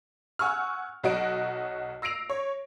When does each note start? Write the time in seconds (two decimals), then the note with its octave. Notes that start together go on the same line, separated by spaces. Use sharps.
0.39 F#5 G#5 C#6 E6 F6
1.04 B1 F#3 F#4 D#5 F#5 D7
2.02 E6 A#6 C7 D7 F7
2.30 C#5